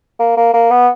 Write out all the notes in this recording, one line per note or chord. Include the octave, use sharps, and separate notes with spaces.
A#3
A#3
A#3
B3